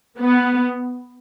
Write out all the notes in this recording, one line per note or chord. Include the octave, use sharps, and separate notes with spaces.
B3